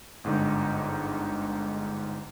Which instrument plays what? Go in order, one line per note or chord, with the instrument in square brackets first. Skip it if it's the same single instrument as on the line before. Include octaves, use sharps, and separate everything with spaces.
[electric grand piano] G1 G#2 D3 D#4